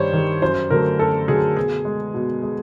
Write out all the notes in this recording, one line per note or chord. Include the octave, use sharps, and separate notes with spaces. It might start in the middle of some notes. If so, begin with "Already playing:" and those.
Already playing: G2 D#3 G3 C5 C#5
D#3 G3
F#2 C5
D3 F#3 A3 A#4
F#2 A4
D3 F#3 A3 G#4
B2 G#4
G#3
B2
G#3